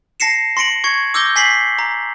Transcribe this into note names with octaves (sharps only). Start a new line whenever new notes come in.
A5 A#6 C7 C#7 E7
C6 A#6 C#7 D7 F#7
C#6 G#6 C#7
D6 E6 G6 A#6 G7
G#5 B6 C7 F#7
A#5